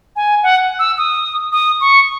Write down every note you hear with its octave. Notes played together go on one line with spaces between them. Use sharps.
G#5
F#5
E6
D#6
D#6
C#6